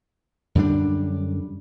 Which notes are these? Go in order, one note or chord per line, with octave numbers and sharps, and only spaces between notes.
F#2 D3 G3 D4